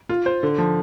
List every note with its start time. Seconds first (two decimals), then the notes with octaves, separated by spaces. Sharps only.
0.09 F4
0.26 C5
0.43 D3
0.58 F3